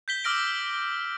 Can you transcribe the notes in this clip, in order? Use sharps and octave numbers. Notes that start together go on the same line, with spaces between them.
G6 B6 G7
D6 E6 F6 A#6 D7